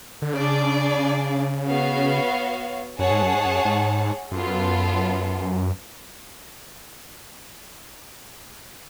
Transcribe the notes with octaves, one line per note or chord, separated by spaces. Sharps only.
D3
C#3 D4 G#4 D5
B3 F#4 C#5 F5
F#2 G#4 C#5 F#5 A5
G#2
F#2
G#2
F#2
G#2
F#2 B3 F4 A4